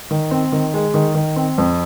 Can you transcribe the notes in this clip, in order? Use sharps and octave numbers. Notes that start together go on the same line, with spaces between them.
D#3
C4
D#3
G#3
D#3
D#3
C4
F2